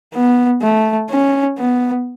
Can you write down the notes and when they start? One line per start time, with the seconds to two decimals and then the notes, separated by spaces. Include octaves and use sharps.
0.14 B3
0.61 A3
1.10 C#4
1.58 B3